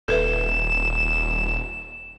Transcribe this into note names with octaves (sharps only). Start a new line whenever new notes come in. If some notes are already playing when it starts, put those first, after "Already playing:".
D#1 A4 B4 E5 E7